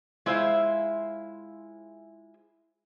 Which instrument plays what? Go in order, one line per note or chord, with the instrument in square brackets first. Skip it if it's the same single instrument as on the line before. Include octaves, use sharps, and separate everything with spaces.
[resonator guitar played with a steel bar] G#3 E4 F4 C5 E5 F5